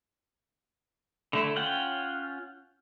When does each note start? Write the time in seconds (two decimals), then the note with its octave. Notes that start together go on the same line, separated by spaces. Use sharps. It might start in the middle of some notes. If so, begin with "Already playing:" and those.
1.33 D3 A3 E4
1.56 C#4 F4 F#5 G5